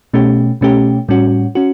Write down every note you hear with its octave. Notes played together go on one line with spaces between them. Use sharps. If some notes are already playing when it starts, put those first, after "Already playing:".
B2 A3 C#4 G4
B2 A3 C#4 G4
A2 G3 C#4 F#4
C#4 F#4